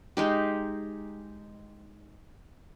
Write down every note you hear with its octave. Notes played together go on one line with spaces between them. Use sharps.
G#3 D#4 G4